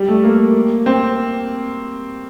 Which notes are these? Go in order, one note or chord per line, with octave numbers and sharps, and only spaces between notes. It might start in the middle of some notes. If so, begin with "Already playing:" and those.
Already playing: G3
A3
A#3
C4